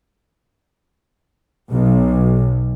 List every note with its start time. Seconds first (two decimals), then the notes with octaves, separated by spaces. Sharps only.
1.71 B1